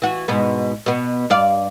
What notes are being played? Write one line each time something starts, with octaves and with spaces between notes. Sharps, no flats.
E3 F#4
G#2 B2 B3
B2 B3
G2 D5 F5